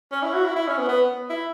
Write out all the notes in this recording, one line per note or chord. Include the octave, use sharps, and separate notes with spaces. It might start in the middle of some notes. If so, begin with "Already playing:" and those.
C#4
E4
F#4
E4
E4
C#4
B3
B3
E4